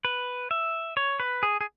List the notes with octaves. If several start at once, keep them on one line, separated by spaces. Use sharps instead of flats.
B4
E5
C#5
B4
G#4
G#4